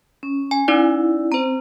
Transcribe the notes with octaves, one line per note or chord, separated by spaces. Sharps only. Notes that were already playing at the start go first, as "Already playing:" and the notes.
C#4
G#5
C#4 D#4 E4 D5
C4 C5 A#5